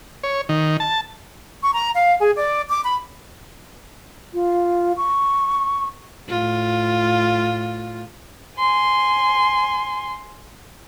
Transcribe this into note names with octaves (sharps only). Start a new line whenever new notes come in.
C#5
D#3
A5
C#6
A#5
F5
G#4
D5
D6
B5
F4
C#6
A2 F4
G#5 C6